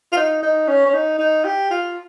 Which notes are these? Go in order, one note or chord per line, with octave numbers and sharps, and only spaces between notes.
F4
D#4
D#4
C#4
C#4
D#4
D#4
G4
F4